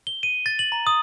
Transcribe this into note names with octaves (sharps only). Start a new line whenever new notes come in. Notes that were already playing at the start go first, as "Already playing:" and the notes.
G7
D#7
A6
F#7
A#5
D#6